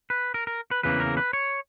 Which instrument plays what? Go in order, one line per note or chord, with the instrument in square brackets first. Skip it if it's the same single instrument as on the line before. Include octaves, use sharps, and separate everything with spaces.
[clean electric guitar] B4
A#4
A#4
B4
E2 C#3 E3 A#3 B4
A#4
B4
C#5